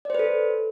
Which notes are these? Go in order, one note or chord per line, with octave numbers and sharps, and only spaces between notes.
A4 B4 C5 D5